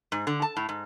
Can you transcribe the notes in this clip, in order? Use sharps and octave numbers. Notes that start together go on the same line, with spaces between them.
G#2
D3
A5
A2
G#2